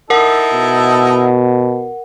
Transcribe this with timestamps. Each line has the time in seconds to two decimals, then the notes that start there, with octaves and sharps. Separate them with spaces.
0.10 D#4 E4 A4 A#4 F#5
0.54 B2